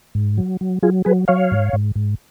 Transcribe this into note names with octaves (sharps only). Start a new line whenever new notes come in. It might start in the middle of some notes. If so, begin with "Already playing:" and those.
G#2
F#3
F#3
F#3 F4 G#4
F#3 G#4 B4
F#3 C#5 F5
G#2
G#2
G#2